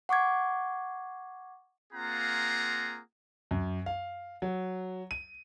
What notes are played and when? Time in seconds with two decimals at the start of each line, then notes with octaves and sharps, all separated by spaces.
0.09 F#5 C#6 D6 G#6
1.93 A#3 C4 F4 G#4 F#5 A#5
3.51 F#2
3.86 F5
4.42 F#3
5.11 D#7